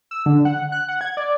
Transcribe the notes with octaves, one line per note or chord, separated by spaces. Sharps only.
E6
D3
F#5
F#6
F#5
G#6
D5